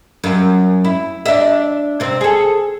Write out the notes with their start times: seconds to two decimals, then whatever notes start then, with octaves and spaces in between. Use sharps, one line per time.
0.24 F#2
0.84 E4
1.26 D4 E5
2.00 C3 C4
2.21 G#4 A4